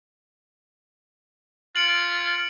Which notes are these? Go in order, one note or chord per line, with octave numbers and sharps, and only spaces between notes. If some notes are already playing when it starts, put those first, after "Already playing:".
F4 C#7 D7 F#7